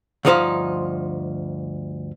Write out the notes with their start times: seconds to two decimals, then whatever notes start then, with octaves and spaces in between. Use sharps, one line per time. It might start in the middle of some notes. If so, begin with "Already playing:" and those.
0.25 D2 G2 F3 D#4 C5 F5